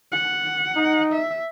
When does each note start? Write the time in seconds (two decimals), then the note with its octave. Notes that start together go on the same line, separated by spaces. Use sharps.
0.12 F#5
0.76 D#4
1.13 E5